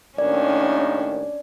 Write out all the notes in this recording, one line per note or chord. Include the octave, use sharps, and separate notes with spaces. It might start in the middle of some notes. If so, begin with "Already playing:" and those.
D#2 A2 D#3 C#4 D4 D5